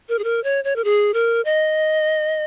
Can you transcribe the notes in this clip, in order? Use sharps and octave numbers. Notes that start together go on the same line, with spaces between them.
A#4
G#4
A#4
C#5
C#5
A#4
G#4
A#4
D#5